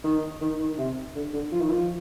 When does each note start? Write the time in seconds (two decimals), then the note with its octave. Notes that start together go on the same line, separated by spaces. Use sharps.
0.04 D#3
0.41 D#3
0.60 D#3
0.78 C3
1.15 D3
1.33 D3
1.52 F3
1.60 D#3
1.70 F3